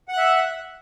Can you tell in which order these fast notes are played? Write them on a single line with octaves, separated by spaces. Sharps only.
F#5 F#6 E5